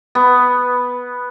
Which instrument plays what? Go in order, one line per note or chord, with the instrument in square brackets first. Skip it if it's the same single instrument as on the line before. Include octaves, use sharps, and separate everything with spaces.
[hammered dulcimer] B3